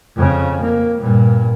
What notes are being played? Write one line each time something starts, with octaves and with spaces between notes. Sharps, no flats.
F2 C#3
A#3
G2 A#2